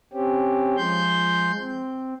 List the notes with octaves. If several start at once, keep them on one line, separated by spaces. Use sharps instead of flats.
C4 C#4 G4
F3 G#3 C6 G6
C4